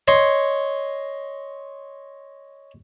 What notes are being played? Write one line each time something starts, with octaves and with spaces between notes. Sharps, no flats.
C#5 D#5 C6